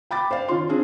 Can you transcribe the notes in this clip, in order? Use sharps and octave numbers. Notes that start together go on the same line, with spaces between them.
G5 B5 D6 A6
C5 D5 F5
D#3 C#4 F4 C6
C4 D4 F4 G#4